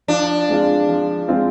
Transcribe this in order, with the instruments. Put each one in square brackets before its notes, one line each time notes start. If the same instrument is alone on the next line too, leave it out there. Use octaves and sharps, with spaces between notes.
[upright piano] F3 [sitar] D4
[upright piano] G#3 C4 F4
F3
G#3 C4 F4